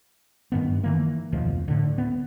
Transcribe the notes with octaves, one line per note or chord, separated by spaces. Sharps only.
G2 D#3 B3
D#3 E3 A#3
F1 D2 B2 F3
A2 D3
B3